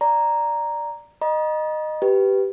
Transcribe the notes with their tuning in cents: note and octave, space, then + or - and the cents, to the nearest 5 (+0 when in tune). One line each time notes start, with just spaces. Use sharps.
D5 +5 A#5 +0
D#5 -15 A#5 +40
G4 -10 B4 +0